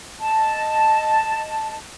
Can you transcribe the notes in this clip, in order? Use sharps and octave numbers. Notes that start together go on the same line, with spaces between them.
D#5 A5